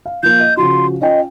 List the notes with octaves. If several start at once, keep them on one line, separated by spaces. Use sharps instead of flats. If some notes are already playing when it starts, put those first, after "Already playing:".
F5
F3 A#3 F4 G6
D#5
C#3 F3 F#4 C6
C#4 F4 D#5 G5